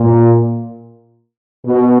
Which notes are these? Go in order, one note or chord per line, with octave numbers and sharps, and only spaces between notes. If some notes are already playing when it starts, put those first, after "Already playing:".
Already playing: A#2
B2